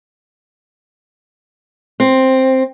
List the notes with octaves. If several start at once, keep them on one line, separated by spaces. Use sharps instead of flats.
C4